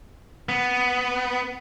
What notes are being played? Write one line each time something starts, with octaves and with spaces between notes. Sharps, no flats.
B3